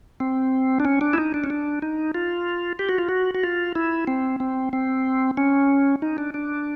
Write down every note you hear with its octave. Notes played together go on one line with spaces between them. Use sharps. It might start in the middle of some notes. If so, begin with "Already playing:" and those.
C4
D4
C#4
D4
E4
D#4
D4
C#4
D4
D#4
F4
G4
F#4
F4
F#4
F#4
F4
E4
C4
C4
C4
C#4
D#4
D4
D4